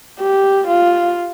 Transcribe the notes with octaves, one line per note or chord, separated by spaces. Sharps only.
G4
F4